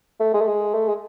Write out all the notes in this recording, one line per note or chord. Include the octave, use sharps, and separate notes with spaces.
A3
G#3
A3
G#3
A3
G#3